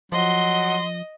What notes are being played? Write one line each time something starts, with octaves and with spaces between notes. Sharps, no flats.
F3 F#3 D#5 C6